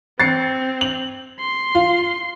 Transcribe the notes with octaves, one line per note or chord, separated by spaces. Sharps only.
C4 A6 C7 C#7
F#7
C6
F4